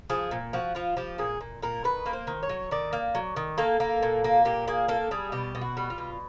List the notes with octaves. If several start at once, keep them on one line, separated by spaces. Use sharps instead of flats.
F3 G#4
A#2
F3 F#4
F3 F4
F3 G4
A#2 G#4
A#2
A#2 A#4
D#3 B4
A#3
C5
D#3
C#5
F#3
D#3 D5
A#3
F#3
D#3
A#3 A4
A#3
A#2
A#3
A#2 G4
A#3 G#4
A#3 A4
G3 G#4
B2 G4
B2
F#4
G3
F4
B2